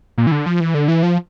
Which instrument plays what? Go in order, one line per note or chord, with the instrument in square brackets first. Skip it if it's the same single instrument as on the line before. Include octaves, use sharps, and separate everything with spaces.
[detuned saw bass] A#2
E3
D3
F3
E3
D3
E3
F3